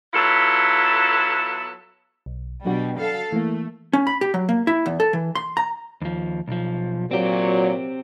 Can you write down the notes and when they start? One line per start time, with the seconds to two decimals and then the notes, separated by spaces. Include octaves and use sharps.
0.14 F#3 B3 E4 F4 A4
2.26 B1
2.65 B2 F#3 G3 D4 F#4
2.98 A4 F5 A5
3.32 E3 A3 A#3
3.93 C#4
4.07 B5
4.21 G4
4.34 F#3
4.49 A#3
4.67 E4
4.86 E2
5.00 A4
5.13 E3
5.35 C6
5.57 A#5
6.02 D#2 F3
6.48 B1 F3
7.11 A#2 F#3 C4 G4